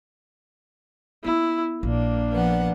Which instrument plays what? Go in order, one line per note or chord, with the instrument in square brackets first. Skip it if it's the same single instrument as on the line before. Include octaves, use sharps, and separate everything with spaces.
[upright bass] A#3 B3 [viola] E4
[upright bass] A#1 [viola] A#3 D4
[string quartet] F3 B3 F#5